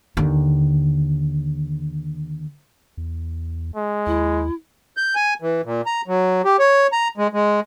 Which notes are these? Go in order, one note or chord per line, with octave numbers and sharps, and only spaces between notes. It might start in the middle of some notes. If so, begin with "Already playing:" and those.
D#2 D3
E2
G#3
D#2 E4
G6
G#5
E3
A#2
A#5
F#3
G4
C#5
A#5
G#3
G#3